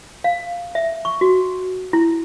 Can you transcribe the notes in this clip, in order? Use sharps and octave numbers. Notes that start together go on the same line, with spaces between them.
F5
E5
C#6
F#4
E4